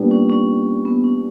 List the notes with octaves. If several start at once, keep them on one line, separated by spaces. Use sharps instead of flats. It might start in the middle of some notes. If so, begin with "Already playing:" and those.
Already playing: A#2 G3 B3 D4
C#4
C#4
B3
C#4